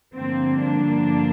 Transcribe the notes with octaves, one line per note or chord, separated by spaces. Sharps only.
G2 D3 F3 A#3 C4
D4